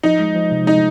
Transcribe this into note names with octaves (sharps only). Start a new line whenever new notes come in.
F3 D#4
G#3
F3
C3
G#3 D#4